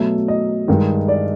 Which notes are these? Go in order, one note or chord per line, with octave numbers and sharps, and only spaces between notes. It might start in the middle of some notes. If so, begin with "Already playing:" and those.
Already playing: B2 F#3 A3 E5
D#5
G2 D#3 G#3
D5